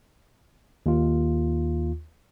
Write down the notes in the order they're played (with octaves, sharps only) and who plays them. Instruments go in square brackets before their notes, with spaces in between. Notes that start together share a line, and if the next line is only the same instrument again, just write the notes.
[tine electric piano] D#2 F4